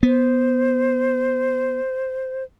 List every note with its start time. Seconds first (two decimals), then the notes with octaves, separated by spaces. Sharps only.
0.03 B3 C5